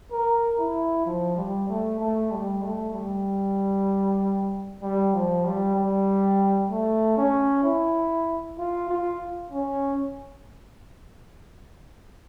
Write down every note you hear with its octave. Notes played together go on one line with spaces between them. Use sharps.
A#4
E4
F3
G3
A3
A3
G3
A3
G3
G3
F3
G3
G3
A3
C#4
E4
F4
F4
C#4